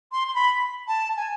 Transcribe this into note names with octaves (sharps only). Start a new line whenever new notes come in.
C6
C6
B5
A5
G#5